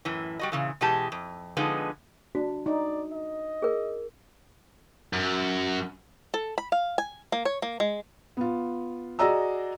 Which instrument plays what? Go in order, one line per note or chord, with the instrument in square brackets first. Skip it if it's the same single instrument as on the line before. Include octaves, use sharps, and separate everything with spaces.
[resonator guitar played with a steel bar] F#2 A2 E3
G3 F#4 D#5
A#2 C#3 E3
B2 E3 G#3 G4 A5
F2
D3 F3 G#3 B3 D#4
[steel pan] D4 [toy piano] F#4
[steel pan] D#4 [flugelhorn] D5
[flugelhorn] D#5
[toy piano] G#4 A#4
[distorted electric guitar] F#2
[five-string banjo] A4
B5
F5
G#5
A#3
C#5
A#3
G#3
[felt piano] B3 F4
F#4 G#4 D5 D#5 A#5 E6